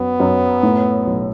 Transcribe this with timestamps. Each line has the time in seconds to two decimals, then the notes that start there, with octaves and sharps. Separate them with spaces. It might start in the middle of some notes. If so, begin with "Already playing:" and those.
Already playing: F#2 B3
0.20 F#2
0.63 A2
1.07 B1